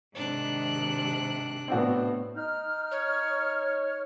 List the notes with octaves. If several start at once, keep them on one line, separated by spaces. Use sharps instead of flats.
G#2 C3 D#3 D4 F#6
A2 B3 C4 D4 F#4
D#4 F6
C#5